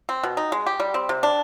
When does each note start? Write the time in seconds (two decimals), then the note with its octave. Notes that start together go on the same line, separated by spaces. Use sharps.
0.09 C4
0.23 B2
0.37 D#4
0.52 G#3
0.66 G4
0.80 G3
0.94 C4
1.09 C3
1.23 D4